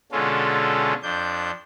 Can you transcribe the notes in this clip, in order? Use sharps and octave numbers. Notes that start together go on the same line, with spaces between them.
B2 D3 G#3 C#4 F4 A4
F2 D4 G6